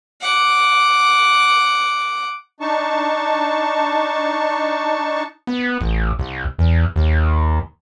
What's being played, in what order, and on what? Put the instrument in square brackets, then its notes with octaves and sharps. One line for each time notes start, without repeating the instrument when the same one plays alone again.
[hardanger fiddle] F#5 D6
[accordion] D4 D#4 A5 C#6
[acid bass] B3
A1
C2
E2
D#2